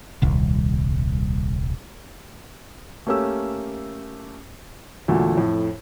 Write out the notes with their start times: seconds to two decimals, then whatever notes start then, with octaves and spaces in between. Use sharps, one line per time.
0.22 D#1 C2
3.07 A3 A#3 C#4 G4 E6
5.08 E2 A#2 D3 F#3 A3
5.37 F2 A2